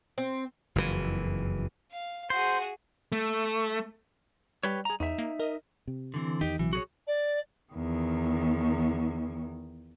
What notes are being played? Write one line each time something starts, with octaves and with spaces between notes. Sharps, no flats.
C4
F#1 F2 G#2 E3
F5
F#4 G#4 C5
A3
G3 G4 B4 C#5
G#4 A#5
E2 D#4 E5
A#3
A#4 D#5
C3
D3 E3 C4
E2 D#3 D#4 G4
A#1 C3 E3 F#3
F#4 G#4 C#5
D5
E2 D#3